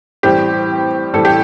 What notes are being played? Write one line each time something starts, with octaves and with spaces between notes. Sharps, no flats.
A2 E3 G3 C4 G4
A2 E3 G3 C4 A4
G4